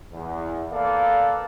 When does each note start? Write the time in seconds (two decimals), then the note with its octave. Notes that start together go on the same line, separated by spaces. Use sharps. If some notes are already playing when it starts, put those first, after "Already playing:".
0.13 E2
0.72 A#3 A4 B4 D5 F5